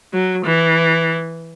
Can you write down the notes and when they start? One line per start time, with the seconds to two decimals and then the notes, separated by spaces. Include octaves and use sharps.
0.13 F#3
0.46 E3